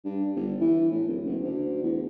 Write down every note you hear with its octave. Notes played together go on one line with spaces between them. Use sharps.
G2
G1
E3
A2
D1
F#1
D2
E2